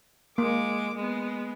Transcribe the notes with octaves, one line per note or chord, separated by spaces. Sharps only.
G#3 A#3 D6
G#3 B3